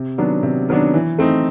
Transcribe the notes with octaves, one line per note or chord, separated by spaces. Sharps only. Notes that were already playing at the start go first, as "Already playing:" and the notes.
Already playing: C3
D#3 F#3 B3 D4
C3
D#3 F#3 B3 D4
E3
A3 C4 D#4